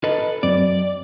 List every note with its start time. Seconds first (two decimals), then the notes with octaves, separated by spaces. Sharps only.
0.04 A4 B4 D#5
0.43 F#2 F#3 C4 D5